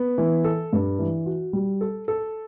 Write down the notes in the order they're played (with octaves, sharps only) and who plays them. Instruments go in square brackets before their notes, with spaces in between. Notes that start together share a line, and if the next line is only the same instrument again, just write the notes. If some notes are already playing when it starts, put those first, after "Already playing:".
Already playing: [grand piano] B3
E3
A4
G2
E3
F#4
G3
A4
A4